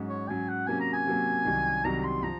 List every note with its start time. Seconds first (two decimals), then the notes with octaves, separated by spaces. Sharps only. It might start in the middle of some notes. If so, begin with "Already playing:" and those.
Already playing: G#2 F#3 C#4
0.09 C#5
0.28 G#2 F#3 C#4 G#5
0.49 F#5
0.67 C3 F#3 A#3 C#4 G#5
0.81 A#5
0.94 G#5
1.06 C3 F#3 A#3 C#4
1.45 C2 C3 D#3 F#3
1.84 C2 C3 D#3 F#3 A#5
1.99 A#5
2.04 C6
2.23 F3 A#5